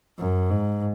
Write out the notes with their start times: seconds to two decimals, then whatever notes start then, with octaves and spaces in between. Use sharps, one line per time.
0.18 F#2
0.50 G#2